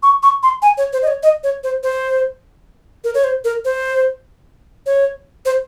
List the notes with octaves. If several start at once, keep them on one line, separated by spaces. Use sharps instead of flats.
C#6
C#6
C6
G#5
C#5
C5
D#5
C#5
D#5
C#5
C5
C5
A#4
C#5
C5
A#4
C5
C#5
C5